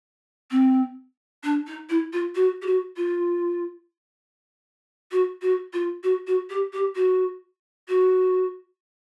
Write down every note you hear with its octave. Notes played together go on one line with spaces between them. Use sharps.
C4
D4
D#4
E4
F4
F#4
G4
F#4
F4
F#4
F#4
F4
F#4
F#4
G4
G4
F#4
F#4